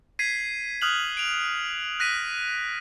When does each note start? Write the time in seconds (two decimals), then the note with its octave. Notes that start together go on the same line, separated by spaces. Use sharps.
0.19 G#6 B6 C7 D#7
0.82 D#6 F6 F#6 F7 F#7
1.17 D7 F7
2.00 F#6 A#6 B6 D#7